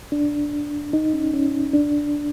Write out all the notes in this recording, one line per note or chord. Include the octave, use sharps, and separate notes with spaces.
D4
D#4
C#4
C#4
D4